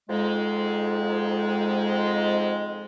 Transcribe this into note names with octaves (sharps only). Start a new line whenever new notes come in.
F2 G#2 G#3